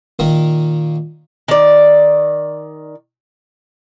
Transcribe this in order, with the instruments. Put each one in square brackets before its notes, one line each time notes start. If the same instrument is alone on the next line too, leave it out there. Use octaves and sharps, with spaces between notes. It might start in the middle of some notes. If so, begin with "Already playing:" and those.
[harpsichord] A#2 D#3 A#3 D#4 D#6
[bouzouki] D#3 D5